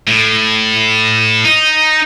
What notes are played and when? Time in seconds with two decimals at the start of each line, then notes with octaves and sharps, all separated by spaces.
0.07 A2
1.45 D#4